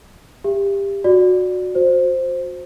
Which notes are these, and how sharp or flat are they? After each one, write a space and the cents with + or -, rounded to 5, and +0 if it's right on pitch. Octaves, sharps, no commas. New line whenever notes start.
G4 +20 E5 +30
F#4 -20 D5 +0
F#4 -35 C5 +0